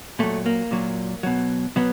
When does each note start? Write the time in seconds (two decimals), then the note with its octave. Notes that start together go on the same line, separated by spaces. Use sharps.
0.19 A#2 F#3 A3
0.46 A#3
0.71 A#2 F#3
1.23 B2 F#3
1.76 B2 F#3 B3